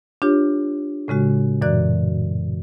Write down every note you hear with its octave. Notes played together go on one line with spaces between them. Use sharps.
D4 F4 G4 C#5
A2 C#3 G#3 F#4
F#2 A#2 E3 D5 F#6